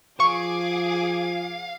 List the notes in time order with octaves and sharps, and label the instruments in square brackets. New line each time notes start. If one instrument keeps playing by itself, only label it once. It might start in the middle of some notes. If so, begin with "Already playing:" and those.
[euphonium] F3 [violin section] G#4 D6 [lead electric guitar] F5 [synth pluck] C#6